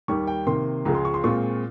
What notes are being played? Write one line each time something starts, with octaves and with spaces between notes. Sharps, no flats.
D#2 D#3 G3 C#6
G5
C3 D#3 A#3 C6
C#2 C#3 F3 G#3 A#5
C6
C#6
C6
A#2 G#3 C4 F4 C#6